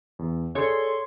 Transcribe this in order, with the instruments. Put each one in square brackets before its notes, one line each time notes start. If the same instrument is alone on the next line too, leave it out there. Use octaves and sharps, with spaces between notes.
[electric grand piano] E2
[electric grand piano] G#4 A4 D5 [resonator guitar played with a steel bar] C#5 [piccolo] C6